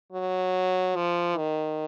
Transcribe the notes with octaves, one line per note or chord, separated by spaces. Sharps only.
F#3
F3
D#3